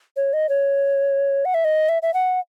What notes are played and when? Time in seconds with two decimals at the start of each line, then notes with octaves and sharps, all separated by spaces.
0.17 C#5
0.33 D#5
0.49 C#5
1.45 F#5
1.54 E5
1.65 D#5
1.89 E5
2.02 E5
2.14 F#5